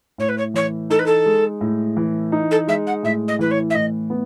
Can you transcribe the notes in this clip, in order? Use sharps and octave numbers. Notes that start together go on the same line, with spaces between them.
A2 C#5
B4
C#5
E3 C#5
D#4 A4
B4
A4
G#3
A2
E3
D#4
A4
G#3 E5
F#5
A2 E5
D#5
E3 B4
C#5
E5
A2 D#5
B3